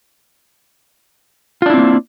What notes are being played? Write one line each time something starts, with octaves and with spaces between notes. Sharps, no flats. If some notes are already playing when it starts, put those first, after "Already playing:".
A#3 C4 D4 E4 F4